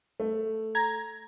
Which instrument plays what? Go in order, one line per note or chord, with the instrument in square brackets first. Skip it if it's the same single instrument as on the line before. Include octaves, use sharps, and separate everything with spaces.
[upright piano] A3
[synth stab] A#5 G#6